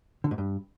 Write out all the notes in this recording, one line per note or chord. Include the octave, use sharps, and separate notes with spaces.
D3
G#2
G2